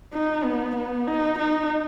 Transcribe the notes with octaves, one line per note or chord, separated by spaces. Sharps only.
D#4
B3
B3
D#4
D#4